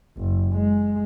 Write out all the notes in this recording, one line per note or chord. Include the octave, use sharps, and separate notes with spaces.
F#1
G#3